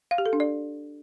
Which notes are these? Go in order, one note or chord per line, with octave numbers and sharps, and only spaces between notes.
F5
G4
A4
D4
D5